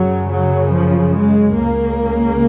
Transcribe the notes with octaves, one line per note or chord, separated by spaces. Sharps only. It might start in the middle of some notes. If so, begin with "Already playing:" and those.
Already playing: F#2 C#3 F#3
F#3
F3
G#3
C#2 C#3 A#3